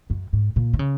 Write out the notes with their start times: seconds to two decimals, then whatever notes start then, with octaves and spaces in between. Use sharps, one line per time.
0.10 F#2
0.33 G#2
0.56 A#2
0.73 D#3
0.79 C#3